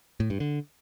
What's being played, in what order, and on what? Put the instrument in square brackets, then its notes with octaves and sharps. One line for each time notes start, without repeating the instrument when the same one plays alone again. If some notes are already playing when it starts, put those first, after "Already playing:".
[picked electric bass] A2
G2
D3